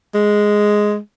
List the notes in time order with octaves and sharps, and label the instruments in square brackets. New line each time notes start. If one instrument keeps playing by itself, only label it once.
[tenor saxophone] G#3